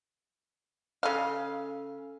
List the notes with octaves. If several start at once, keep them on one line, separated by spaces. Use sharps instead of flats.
C#3 A4 F5 G#5 E6